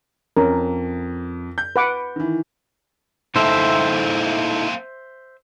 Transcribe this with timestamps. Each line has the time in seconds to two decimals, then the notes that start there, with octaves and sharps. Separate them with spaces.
0.37 F2 C#4 A#4
1.58 G6
1.76 B4 F#5 D6
2.16 D#3 E3
3.36 A#3 C4 D#4 E4 A4 C5 E5